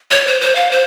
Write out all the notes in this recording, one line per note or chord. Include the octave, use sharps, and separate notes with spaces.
C#5
C5
C5
F5
C5